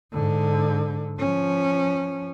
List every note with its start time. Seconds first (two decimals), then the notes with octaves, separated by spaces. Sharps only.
0.13 G#2 D3
1.19 F3 C#4